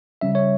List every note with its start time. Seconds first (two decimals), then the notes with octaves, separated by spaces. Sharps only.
0.21 C#3 G3 C#4 E5
0.35 C#5